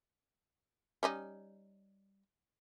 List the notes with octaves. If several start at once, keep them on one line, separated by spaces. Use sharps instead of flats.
G3 C#4 D#4